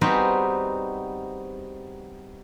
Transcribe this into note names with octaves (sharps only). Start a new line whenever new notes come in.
G3 B3 C4 D#4 F#4 G#4